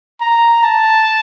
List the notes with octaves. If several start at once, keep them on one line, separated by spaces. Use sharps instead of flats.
A#5
A5